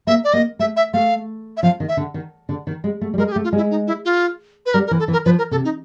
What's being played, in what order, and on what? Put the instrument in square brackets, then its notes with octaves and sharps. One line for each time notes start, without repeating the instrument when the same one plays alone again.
[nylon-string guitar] A#3 [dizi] E5
[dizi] D5
[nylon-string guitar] A#3 [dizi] D#5
[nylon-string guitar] A3 [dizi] E5
[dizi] E5
[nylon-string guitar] A3 [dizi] F5
[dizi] E5
[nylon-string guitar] F3 [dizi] F5
[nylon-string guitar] D#3
[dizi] E5
[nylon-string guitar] D3
D#3
D3
D#3
G#3
A3
G3
[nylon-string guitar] G#3 [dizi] A#4
[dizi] G#4
G4
[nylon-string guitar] A3
[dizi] F4
[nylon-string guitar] G#3 [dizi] E4
[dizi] D#4
E4
F4
B4
[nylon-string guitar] G3 [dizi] A#4
[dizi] A#4
[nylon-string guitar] E3
[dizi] A4
[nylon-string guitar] E3
[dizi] A#4
[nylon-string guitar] F3 [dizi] B4
[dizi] A#4
[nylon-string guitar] C3 [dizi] A4
[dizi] D#4